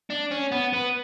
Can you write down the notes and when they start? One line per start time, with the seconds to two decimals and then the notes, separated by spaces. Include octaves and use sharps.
0.10 D4
0.31 C#4
0.51 B3
0.73 B3